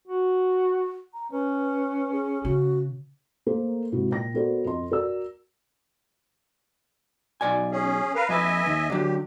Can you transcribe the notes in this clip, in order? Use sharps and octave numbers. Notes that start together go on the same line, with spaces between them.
F#4
A#5
C#4 B4
G#4
C#3 F#4
A3 A#3 A#4 C5
G#2 C3 E4 F#4
A#2 G5 A#6
B3 F#4 A4 A#4 C5 D5
F2 D#5 C6
F#4 A#4 D5 E6
B1 D5 G#5
C#4 G#4
A#4 B4 F5
F2 B4 D#5 E5 G#5
D#2
D3 F#3 G4